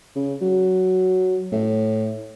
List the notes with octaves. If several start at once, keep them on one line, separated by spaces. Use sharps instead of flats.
C#3
F#3
A2